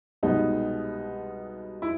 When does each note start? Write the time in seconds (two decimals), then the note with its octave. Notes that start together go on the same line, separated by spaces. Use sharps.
0.23 C2 B2 G#3 B3 D#4
1.82 E4